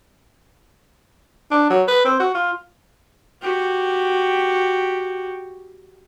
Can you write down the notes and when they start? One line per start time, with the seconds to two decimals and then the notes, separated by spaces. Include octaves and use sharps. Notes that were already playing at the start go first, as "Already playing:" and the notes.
1.51 D4
1.70 F#3
1.88 B4
2.05 C4
2.20 F#4
2.35 F4
3.42 F#4 G4